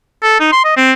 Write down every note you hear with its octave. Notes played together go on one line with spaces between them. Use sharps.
A4
D#4
C6
D#5
C4